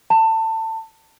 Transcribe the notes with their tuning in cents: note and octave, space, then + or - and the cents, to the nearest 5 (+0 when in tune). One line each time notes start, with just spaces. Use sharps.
A5 +25